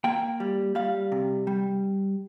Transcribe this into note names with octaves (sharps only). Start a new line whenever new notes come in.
A#3 G5
G3
G3 F5
C3
G3